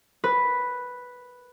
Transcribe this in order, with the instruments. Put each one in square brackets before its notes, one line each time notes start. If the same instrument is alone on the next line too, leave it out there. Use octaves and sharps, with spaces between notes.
[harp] B4